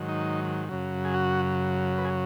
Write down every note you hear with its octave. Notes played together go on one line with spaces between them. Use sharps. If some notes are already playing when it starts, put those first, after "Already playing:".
Already playing: G#2 D#3 F#3
D#4
F#2 C#3 F#3
G#4
F#4
B4
G#4